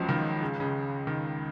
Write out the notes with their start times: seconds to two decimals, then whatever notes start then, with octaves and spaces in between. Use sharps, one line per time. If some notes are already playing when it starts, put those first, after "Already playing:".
Already playing: C#2 F3 F#3
0.09 D#3
0.41 C#3
0.60 C#3
1.07 D#3